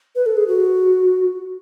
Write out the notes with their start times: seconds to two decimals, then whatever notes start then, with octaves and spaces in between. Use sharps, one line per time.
0.16 B4
0.26 A4
0.37 G#4
0.48 F#4